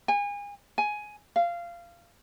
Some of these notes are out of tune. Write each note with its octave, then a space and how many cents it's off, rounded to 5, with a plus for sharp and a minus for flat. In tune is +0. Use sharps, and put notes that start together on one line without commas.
G#5 -35
G#5 +10
F5 -20